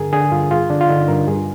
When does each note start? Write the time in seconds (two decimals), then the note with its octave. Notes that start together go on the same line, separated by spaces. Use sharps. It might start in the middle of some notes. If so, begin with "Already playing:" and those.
Already playing: G2 D3 G#4 A#4
0.13 D3 G#4
0.32 G2 F4
0.51 G2 F4
0.70 D3 D4
0.81 F4
0.89 D3 D#4
1.08 G2 A#4
1.28 G2 G#4